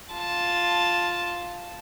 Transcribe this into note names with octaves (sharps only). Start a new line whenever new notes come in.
F4 A5